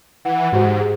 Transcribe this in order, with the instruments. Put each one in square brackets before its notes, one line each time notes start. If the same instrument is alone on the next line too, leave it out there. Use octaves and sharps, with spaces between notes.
[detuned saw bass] E3 [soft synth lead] F#5
[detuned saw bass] G#2 [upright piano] F#4 G4 C5
[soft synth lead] G#4